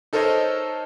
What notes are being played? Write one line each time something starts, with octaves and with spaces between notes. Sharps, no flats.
D#4 A4 A#4 C5 C#5 D#5